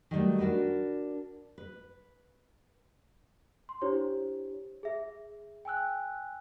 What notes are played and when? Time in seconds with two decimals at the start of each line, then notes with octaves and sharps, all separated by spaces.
0.11 D#3 F#3 G3 A3
0.39 D4 F#4 A#4 B4
1.58 B4
3.69 C6
3.81 D4 E4 G4 C5 C#5
4.83 G#4 E5
5.65 G5 G#5 E6 F#6